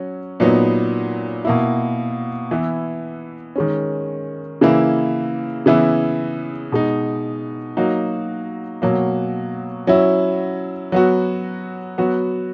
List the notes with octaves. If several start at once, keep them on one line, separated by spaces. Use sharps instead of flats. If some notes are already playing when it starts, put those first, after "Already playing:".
Already playing: F#3 C#4
A#2 F#3 B3 D#4
B2 A#3 E4
E3 B3 E4
D#3 G#3 C#4
C#3 E3 A#3 E4
C#3 E3 B3 E4
B2 G#3 D#4
F#3 A#3 D#4 F#4
B2 F#3 A#3
F#3 C#4 E4
F#3 B3 F#4
F#3 B3 F#4